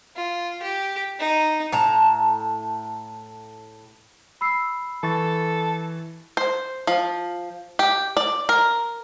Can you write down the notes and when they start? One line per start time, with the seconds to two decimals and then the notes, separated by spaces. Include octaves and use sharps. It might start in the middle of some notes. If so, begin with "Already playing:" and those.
0.16 F4
0.62 G4
1.19 D#4
1.72 A2 A5 A#5
4.41 B5 E6 C7
5.03 E3 A4 C#6 A6
6.37 C5
6.87 F3
7.79 G4
8.17 D5
8.49 A#4